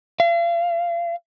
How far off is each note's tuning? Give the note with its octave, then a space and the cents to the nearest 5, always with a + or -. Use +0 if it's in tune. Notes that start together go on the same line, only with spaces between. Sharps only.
F5 -40